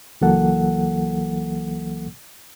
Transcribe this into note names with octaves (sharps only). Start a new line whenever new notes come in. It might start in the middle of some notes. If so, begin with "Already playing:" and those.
C#2 E3 F#3 A#3 A4 F#5